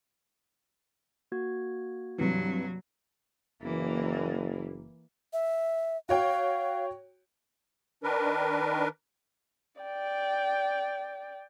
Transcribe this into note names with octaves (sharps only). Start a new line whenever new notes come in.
A#3 F#4 G#6
G2 C3 E3 F#3
F#1 E3 A#3
E5
F#4 C#5 F5 G5
D#3 D4 A#4 B4
D5 G5